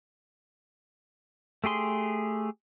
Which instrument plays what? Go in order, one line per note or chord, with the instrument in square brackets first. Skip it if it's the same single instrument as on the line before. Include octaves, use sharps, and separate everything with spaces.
[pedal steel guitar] A3 G4 G#4 C6